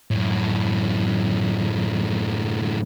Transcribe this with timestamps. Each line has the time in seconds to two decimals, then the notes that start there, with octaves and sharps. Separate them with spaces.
0.11 F#2 A2